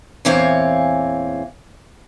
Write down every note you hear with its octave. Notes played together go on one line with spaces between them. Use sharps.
E2 A#2 E3 C4 C#5 F5